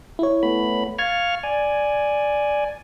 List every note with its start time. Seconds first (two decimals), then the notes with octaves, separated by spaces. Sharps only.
0.19 E4 C#5
0.43 A3 B3 B5
0.98 F5 C#6 F6 G#6 A6
1.43 D5 G#5